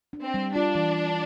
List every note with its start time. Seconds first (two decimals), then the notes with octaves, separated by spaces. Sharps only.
0.13 D4
0.24 C4
0.34 G3
0.55 D4 F4
0.75 E3